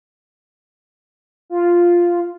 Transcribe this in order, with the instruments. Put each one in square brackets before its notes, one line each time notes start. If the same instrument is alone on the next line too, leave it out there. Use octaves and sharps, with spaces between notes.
[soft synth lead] F4